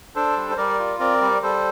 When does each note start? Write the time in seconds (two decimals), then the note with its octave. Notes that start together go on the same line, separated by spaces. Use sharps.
0.15 D4 A4 C5
0.37 G3
0.51 C5
0.57 G3 A#4 D5
0.79 F4
1.00 C4 A#4 D5
1.21 G3
1.43 G3 A4 C5